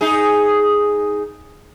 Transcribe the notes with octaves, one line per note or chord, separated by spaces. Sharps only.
D#4 G#4